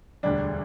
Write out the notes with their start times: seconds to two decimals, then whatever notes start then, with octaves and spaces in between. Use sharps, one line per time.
0.23 E1 D2 D3 G3 D4